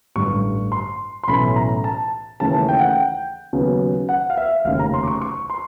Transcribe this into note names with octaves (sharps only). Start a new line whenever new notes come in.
A1 G2 D3 C#6
C6
C6
B1 A2 E3 A3 C#4 B5
A#5
A5
D#2 C#3 E3 A3 A5
G5
F#5
G5
D#2 C#3 F#3 B3
F#5
F5
E5
F1 D#2 C#3 F5
A#5
C6
D6
C#6
C#6
C6